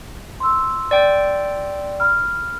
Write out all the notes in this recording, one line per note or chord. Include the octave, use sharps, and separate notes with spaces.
C6 E6
D5 G5
B5 F6